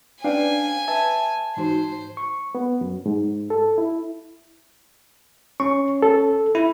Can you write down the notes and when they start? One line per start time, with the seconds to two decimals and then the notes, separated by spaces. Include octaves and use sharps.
0.24 C#4 D4 B4 D5 F5 G5 G#5
0.88 B4 E5 A5 G#6
1.57 G#2 E3 D#4 F#4 C5
2.17 C#6
2.55 B3
2.81 F#2
3.06 G#2
3.50 A4
3.78 E4
5.60 C#4 C#6
6.02 A4
6.55 E4